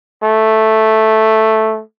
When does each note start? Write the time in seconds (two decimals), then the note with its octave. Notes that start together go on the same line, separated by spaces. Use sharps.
0.23 A3